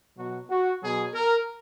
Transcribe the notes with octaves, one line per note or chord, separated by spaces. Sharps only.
B2 F#3 F#4
F#4
B2 F#3 G#4
A#4